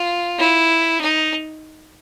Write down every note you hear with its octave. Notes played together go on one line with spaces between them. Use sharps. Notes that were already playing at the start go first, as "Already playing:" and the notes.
Already playing: F4
E4
D#4